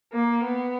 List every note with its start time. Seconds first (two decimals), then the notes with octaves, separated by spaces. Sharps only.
0.13 A#3
0.44 B3